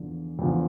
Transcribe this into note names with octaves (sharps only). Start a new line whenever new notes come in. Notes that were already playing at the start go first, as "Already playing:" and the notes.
Already playing: E2 D3 F3
E2 D3 F3